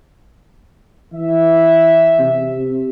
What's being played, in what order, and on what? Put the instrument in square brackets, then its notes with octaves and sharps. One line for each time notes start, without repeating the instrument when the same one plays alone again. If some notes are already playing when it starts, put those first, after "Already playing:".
[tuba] E3 [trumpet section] E5
[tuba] C3